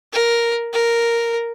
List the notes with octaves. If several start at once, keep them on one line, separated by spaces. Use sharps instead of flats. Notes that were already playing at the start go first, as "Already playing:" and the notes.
A#4
A#4